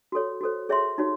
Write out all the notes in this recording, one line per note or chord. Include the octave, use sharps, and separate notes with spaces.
F#4 A4 C#5
F#4 A4 C5
G#4 C#5 E5 C6
D#4 F#4 C#5